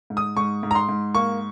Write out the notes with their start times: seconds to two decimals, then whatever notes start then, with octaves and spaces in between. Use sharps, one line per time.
0.10 G#2
0.17 D#6
0.37 G#2 C#6
0.63 G#2
0.71 A#5
0.75 C6
0.89 G#2
1.15 A#3 C#6